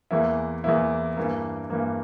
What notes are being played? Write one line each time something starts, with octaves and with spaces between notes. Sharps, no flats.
E2 E3 A#3 E4
E2 E3 A#3 E4
G2 E3 A#3
G2 E3 A#3